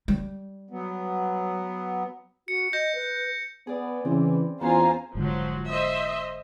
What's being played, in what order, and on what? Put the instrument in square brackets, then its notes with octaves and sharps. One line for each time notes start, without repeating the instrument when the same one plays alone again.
[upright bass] G3
[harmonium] F#3 B3
[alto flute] F#4 [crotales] C#7
[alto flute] D#5 [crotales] G6 A#6
[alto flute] B4
[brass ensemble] B3 [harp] G#4 D5
[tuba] C#3 [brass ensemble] E3 [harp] C4
[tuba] E2 [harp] B3 C#4 [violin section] F4 C5 G#5 [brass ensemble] A#5
[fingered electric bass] F1 G#2 D3 [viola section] F3 F#3
[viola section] C5 D#5 E5